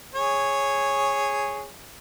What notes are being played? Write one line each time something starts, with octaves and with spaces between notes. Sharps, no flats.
G#4 C#5